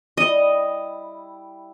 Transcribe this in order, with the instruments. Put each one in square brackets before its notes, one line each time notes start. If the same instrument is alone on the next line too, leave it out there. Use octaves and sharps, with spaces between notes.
[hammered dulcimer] G3 E4 [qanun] D#5